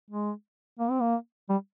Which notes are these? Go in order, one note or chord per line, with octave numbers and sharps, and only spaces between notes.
G#3
A#3
C4
A#3
G3